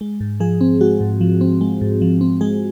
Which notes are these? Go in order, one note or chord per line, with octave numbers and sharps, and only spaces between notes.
G#3
G#2
F3 G#4
C4
G#3 F#4
G#2
F3
C4
G#3
G#2
F3
C4
G#3 G#4